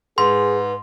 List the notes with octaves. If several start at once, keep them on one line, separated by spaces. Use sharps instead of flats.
G#2 G#4 B4 C6